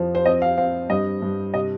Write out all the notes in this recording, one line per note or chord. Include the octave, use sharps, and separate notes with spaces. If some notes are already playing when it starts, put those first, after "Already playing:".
Already playing: F2 F3
C5
C4 D#5
F5
C4 F5
G2 D#5
G2
C3 D#5